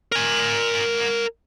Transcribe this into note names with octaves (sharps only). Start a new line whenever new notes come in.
A#4 G#5